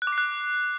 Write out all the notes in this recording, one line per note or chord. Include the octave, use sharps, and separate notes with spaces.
F#6
D6
C7
F#6